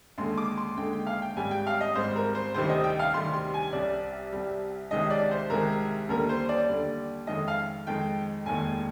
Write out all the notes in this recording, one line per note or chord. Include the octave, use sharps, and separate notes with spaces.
D#2 D3 G#3 C6
D6
C6
D#2 D3 G#3 G5
G5
F5
G5
G#1 G#2 G3 G#5
G5
F5
D#5
G#1 G#2 G3 C5
A#4
C5
D2 C3 D#3 G3 C5
D#5
G5
F5
D2 C3 D#3 G3 C6
C6
G#5
C2 C3 G3 D5
C2 C3 G3
C2 C3 D#3 G#3 D#5
D5
C5
C2 C3 D#3 G#3 A#4
D#2 D3 G3 A#4
C5
D5
D#2 D3 G3
F2 D#3 G#3 D#5
F5
F2 D#3 G#3 G5
F1 D#2 D#3 G#3 G#5